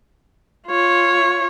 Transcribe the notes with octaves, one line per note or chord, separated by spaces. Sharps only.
F4 C#5